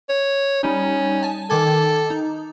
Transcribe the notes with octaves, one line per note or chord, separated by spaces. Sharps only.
C#5
G3 C#4 D#4
G#5 A5
D#3 A4 D6 G#6
D#4